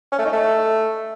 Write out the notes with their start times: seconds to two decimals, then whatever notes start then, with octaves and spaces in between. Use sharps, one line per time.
0.12 C#4
0.19 A3
0.26 D#4
0.32 A3